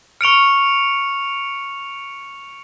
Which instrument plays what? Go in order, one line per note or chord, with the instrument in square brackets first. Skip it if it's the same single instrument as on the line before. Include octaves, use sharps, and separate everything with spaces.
[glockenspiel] C#6 F6 [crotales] C#7 D7 F7